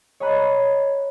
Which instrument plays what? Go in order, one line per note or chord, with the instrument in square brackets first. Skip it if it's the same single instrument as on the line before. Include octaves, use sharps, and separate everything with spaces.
[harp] C#5 D#5 G#5 A#5 B5 F#6